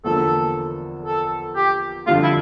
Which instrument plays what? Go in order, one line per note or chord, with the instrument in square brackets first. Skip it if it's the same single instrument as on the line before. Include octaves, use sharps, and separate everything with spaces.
[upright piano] E2 D3 F3 A#3 [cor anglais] A4
[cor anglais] A4
G4
[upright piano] F2 D3 G3 [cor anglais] F4
[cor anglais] E4